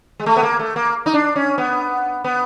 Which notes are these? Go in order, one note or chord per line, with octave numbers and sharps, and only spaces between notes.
G#3
A3
B3
A#3
A3
A#3
D#4
D4
C#4
B3
B3